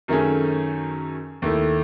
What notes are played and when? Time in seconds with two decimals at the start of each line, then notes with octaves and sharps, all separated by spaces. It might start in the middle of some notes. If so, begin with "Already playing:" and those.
0.08 F#2 D#3 A3 C#4 G#4
1.42 D#2 D#3 A3 E4